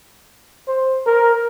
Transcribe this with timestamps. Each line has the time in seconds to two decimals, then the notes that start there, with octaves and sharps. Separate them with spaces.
0.68 C5
1.06 A#4